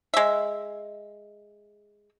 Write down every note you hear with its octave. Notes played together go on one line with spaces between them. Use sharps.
G#3 E5